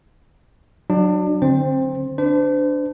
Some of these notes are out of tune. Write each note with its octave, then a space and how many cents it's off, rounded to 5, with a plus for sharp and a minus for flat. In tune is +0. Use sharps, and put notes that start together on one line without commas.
F#3 +0 D4 +30
D3 +0 C4 +20 C5 +0
D4 +0 C5 -40